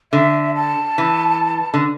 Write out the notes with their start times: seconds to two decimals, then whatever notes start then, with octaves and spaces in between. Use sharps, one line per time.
0.13 D3 E5
0.55 A5
0.98 E3
1.74 D3